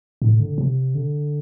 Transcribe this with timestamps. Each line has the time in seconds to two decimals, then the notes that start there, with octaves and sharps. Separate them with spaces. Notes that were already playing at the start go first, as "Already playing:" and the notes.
0.22 A2
0.40 D3
0.58 C3
0.95 D3